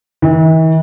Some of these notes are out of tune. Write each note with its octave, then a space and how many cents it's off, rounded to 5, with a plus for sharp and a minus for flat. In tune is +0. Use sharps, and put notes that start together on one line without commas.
E3 -45